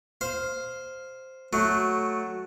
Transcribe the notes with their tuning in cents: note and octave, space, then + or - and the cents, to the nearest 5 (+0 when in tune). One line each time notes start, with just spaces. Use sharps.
C5 +0 F5 +0
F#3 +0 A3 +0